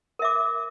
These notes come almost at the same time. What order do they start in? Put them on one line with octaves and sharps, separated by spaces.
A#4 E5 D6